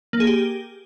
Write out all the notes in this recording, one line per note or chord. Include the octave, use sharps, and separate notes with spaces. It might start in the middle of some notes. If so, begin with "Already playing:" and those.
A#3
G#4
G4